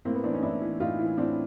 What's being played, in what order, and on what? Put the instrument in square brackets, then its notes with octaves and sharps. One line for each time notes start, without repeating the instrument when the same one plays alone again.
[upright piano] A2 A#3 C4
B3
E3 C4 D4
C#4 D#4
A2 D4 E4
E3
A2 D#4 F4
E3
A2 C4 D4